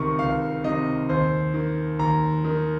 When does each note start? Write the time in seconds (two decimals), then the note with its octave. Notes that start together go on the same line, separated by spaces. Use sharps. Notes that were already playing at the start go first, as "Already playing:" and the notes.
Already playing: C#2 C3 D#3 C#6
0.19 C#2 F5
0.64 C3 D#3 D#5
1.09 D#2 C5
1.54 D#3
1.99 D#2 A#5
2.44 D#3